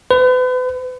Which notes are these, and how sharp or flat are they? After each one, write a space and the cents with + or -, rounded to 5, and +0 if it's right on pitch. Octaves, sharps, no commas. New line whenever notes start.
B4 +40